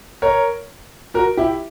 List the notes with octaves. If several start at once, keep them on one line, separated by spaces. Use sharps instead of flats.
A#4 C#5
F#4 A#4
E4 G4